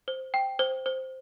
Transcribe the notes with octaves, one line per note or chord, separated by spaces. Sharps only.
C5
G5
C5
C5